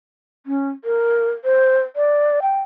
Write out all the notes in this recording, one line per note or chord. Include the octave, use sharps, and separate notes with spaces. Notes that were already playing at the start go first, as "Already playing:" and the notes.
C#4
A#4
C5
D5
G5